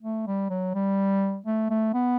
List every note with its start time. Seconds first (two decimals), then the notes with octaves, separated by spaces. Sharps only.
0.02 A3
0.27 G3
0.50 F#3
0.74 G3
1.46 A3
1.70 A3
1.94 B3